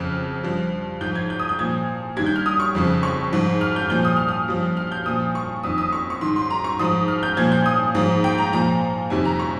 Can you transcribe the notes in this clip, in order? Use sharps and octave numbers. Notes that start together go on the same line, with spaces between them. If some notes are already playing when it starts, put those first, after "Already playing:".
Already playing: F2 C#3 F3 F6
G2 F3
G#2 F3 G6
G#6
G6
D#6
G6
A#2 F3 G#6
G2 D#3 G#6
G6
F6
D#6
C#6
F2 C#3 F3
C#6
G#2 F3
F6
G6
A#2 F3 G6
D#6
F6
D#6
G2 F3
F6
G6
A#2 F3 D#6
C#6
F2 D#3 D#6
D#6
C#6
C#6
G#2 D#3 C6
C6
A#5
C#6
G#2 F3 D#6
F6
G6
A#2 F3 G#6
G6
D#6
G#2 F3
G5
A#5
A#2 F3 A#5
F2 C3 D#3 G#5
A#5
C#6